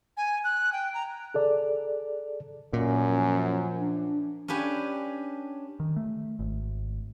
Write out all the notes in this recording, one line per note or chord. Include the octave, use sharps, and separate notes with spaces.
G#5
F#6
G5
A#5
G#4 A4 D5
F#2 A#2 C#4
F3
D4
C#4 D4 G4 B4 G#5
D#3
A3
G#1